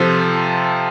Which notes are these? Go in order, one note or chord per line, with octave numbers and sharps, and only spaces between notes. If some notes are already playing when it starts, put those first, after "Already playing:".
Already playing: C3 F3 A4 C5